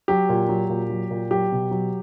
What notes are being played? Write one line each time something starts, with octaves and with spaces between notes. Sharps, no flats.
F#3 G4
A#2
F#3
A#2
F#3
A#2
F#3 G4
B2
F#3